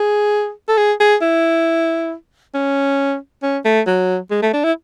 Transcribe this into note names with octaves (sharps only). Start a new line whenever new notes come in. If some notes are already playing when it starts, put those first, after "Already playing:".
Already playing: G#4
A4
G#4
G#4
E4
C#4
C#4
A3
F#3
G#3
A3
D4
E4